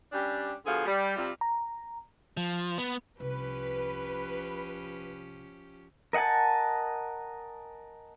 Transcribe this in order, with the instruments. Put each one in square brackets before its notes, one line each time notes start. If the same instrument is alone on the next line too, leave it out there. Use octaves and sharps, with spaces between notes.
[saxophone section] G3 C#4 D4 G4
B2 D3 F3 G#4 A4 F5
G3
C3 G3 F4
[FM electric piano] A#5
[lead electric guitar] F3
B3
[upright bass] C2 C3 [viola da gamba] F3 C#4 G4 [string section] B4
[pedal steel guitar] A#4 D#5 F#5 G#5 A5